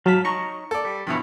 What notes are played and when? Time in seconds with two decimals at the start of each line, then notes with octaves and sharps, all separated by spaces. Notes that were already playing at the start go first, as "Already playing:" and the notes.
0.06 G#2 F#3 F5 A5 B6
0.25 D#4 C#5 A#5 C#6
0.71 A4 D5
0.85 G3
1.07 G2 B2 E3 F3 C#5